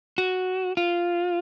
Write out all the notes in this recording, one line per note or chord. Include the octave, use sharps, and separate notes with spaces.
F#4
F4